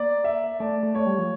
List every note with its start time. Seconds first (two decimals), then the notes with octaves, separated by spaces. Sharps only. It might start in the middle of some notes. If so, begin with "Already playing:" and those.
Already playing: A#3 D5
0.24 E5
0.60 A3 D5
0.83 A3
0.95 A3 C#5
1.06 G3
1.18 F3